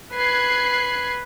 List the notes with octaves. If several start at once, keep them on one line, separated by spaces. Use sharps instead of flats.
B4 F#6 G#6 C7